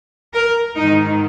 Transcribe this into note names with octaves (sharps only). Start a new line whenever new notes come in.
A#4
G#2 D#3 D#4